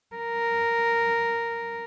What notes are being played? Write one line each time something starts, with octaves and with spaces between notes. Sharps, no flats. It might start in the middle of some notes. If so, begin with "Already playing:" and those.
A#4